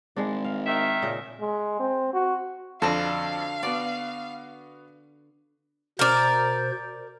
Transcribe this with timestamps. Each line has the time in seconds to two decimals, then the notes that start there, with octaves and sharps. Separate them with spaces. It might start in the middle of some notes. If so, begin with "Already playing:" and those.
0.16 G#1 G#3 D4
0.45 F5
0.65 D#3 E5
1.02 A#2 C#3 D#5
1.41 G#3
1.80 C4
2.14 F#4
2.82 F2 D3 F#4 A4 F5 A5
3.63 B3 F#4 D5
5.99 B2 A#4 C5 D5